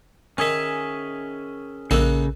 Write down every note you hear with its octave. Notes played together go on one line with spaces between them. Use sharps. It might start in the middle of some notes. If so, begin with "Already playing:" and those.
D#3 C#4 D#4 G#4 E5
A#1 C#3 A#3 D#4 A4 E6 F#6